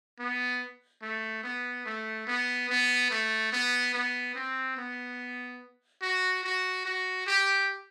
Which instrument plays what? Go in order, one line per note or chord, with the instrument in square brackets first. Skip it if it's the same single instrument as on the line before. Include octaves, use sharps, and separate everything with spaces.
[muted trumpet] B3
A3
B3
A3
B3
B3
A3
B3
B3
C4
B3
F#4
F#4
F#4
G4